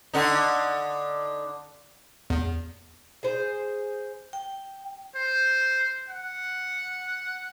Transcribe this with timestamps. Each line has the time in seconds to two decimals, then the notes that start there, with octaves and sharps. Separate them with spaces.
0.14 D3 D#4
2.30 E2
3.23 G#4 C5
4.33 G5
5.16 C5
6.09 F#5